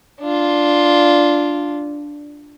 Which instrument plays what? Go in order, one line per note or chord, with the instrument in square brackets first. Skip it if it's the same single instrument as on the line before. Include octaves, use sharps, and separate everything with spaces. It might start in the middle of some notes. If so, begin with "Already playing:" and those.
[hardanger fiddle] D4 F4